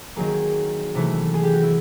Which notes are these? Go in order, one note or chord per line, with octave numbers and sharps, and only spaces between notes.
D#3 F#3 A#3 G#4
C3 E3 A3
G#4
G4
F#4
E4